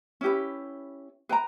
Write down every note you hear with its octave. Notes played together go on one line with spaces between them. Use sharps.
C#4 E4 G4 B4
B4 G5 A#5